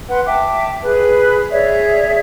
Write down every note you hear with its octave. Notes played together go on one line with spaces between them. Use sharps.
B4 F#5 C6
E5 G5 A5 D6
G#4 B4
G#4 C#5 D5 E5